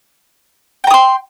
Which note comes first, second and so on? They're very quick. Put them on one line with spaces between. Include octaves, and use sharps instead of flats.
G5 A#5 D#6 C6